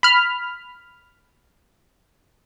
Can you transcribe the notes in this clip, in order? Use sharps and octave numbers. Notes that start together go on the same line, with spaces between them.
B5 F6